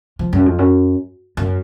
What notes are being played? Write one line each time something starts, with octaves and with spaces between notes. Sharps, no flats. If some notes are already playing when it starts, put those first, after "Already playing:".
F3
F#2
F2
F#2
F#2